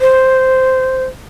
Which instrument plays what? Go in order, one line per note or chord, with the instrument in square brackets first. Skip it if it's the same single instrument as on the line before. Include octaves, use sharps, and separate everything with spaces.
[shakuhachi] C5